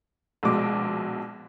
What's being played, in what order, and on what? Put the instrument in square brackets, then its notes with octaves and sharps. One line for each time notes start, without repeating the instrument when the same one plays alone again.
[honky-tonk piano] A#1 B2 G#3 D6